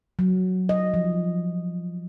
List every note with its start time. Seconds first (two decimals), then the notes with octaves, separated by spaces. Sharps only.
0.19 F#3
0.69 D#5
0.94 F3